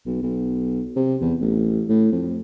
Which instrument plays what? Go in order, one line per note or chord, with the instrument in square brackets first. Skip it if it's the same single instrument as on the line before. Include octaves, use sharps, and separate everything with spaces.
[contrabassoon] B1
B1
C3
E2
A1
A2
F2